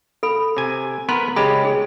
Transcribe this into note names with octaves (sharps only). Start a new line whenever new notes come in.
A4 B5
C3 G#5
B3 A#4 B4 C6
C#3 G#3 G4 B5
G#4